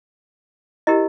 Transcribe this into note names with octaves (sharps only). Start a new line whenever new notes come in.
E4 G4 A#4 D#5